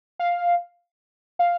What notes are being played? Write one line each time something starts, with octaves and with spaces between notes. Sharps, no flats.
F5
F5